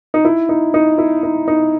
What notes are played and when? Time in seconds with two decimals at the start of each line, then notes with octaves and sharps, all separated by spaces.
0.14 D#4
0.25 E4
0.49 D#4
0.74 D#4
0.98 E4
1.23 D#4
1.48 D#4